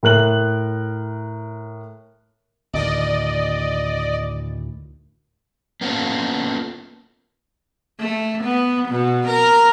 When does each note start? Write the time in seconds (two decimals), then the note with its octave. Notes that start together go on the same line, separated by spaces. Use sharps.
0.03 A2 A#4 F#6 F#7
2.73 D2 A2 D#3 D5 D#5
5.81 A#3 B3 C#4 F4 A4
8.00 A3
8.44 B3
8.88 B2
9.28 A#4